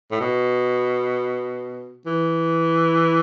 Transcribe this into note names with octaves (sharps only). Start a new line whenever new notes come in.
A2
B2
E3